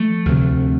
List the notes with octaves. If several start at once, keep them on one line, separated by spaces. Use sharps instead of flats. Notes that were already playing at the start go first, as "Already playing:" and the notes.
Already playing: F3 A3
D2 C3